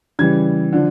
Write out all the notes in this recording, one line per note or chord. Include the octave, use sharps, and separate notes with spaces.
C#3 E3 G3 G#6
D3 F3